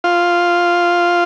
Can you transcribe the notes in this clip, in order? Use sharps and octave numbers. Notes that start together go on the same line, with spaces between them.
F4